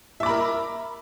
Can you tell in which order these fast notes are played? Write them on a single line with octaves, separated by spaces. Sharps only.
E5 D6 B5 A#4